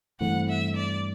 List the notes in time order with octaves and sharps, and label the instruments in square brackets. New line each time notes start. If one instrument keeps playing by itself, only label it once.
[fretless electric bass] G2 E3 A3 C4 [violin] F#5
[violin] E5
D5